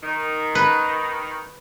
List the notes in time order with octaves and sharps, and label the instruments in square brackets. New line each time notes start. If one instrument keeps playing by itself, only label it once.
[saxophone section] D#3
[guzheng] B4